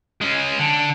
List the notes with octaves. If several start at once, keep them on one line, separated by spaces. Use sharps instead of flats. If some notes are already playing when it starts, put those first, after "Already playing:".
G#3 C#4
D3